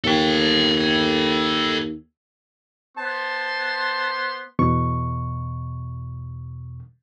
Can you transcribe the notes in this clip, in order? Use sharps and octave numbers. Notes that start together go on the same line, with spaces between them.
D#2 A4 G5
B3 C5 A5 C6
E2 B2 C#6